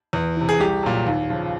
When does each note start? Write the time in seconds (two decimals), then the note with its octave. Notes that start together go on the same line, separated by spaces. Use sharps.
0.13 E2
0.36 C3 E3
0.49 G#4
0.60 C2 G4
0.83 A#2 F#3
1.06 D#2
1.30 C#3 F3